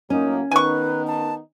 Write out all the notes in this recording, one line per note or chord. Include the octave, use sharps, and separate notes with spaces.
A2 F#3 A#3 C#4 D#4
D#3 B3 D#4 B4 G#5 C#6
A5